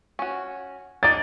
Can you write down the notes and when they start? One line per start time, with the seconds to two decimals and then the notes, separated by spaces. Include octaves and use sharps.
0.19 C#4 F#4
1.03 D4 D#4 D5 A6